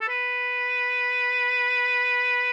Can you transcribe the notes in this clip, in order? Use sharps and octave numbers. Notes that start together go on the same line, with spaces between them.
A4
B4